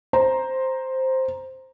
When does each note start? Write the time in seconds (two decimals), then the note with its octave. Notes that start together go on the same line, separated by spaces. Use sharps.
0.13 C5 A#5